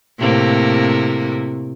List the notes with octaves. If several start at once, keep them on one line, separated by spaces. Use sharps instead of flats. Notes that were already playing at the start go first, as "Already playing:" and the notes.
A2 C3 A#3